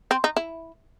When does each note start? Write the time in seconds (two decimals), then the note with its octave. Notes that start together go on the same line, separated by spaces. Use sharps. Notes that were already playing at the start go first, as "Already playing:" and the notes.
0.11 C4
0.24 D#4
0.37 E4